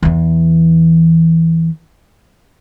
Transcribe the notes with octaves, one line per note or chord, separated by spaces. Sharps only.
E2 E3